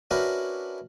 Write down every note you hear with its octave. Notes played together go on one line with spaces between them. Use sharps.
C#4 D4 E4 F#4 A#4 B4